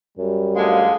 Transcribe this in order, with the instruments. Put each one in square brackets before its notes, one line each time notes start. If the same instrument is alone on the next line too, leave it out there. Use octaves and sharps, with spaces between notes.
[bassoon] F#2 [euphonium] G3
[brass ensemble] D2 F3 F5 [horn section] D3 G#3